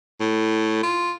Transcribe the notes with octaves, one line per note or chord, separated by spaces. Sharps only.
A2
F4